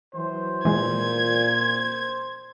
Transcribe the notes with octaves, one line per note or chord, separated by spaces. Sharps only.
E3 F#3 C5
A#2 E3 G#3 G#6